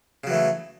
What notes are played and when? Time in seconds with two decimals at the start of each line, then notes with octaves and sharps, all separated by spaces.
0.24 C#3
0.27 F#3
0.30 E3
0.34 A3